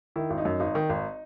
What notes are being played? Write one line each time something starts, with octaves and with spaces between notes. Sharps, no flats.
D#3 E4
G#1
D#4
F#2
G#1 D#4
D#3
G#1